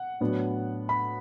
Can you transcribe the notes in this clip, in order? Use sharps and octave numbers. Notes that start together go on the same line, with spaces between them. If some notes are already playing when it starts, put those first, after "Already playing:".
Already playing: F#5
A2 F#3 B3 D4
B5